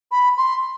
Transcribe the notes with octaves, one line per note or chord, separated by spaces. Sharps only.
B5
C6